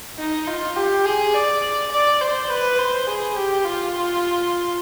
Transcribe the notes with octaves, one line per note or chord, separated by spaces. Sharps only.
D#4
F4
G4
G#4
D5
D5
C5
B4
C5
G#4
G4
F4